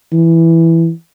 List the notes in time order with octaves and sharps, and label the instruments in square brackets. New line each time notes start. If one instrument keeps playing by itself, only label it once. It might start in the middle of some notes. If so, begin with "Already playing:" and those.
[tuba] E3